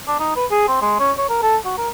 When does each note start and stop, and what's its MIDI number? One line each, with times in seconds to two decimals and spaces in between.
0.08 0.17 62
0.20 0.35 63
0.37 0.46 71
0.51 0.68 68
0.68 0.78 60
0.82 0.98 56
1.00 1.12 61
1.18 1.25 73
1.30 1.40 70
1.43 1.57 69
1.65 1.78 66
1.78 1.90 70